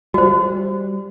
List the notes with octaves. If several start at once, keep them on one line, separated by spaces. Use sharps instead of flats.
G3 F#4 C5